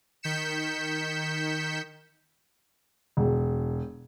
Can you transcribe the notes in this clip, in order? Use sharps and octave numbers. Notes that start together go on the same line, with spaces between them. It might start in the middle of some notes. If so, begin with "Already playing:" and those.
D#3 G6 B6 C#7 E7
E1